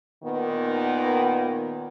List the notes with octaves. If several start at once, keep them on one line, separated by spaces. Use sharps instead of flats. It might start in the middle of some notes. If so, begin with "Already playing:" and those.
A#2 D#3 B3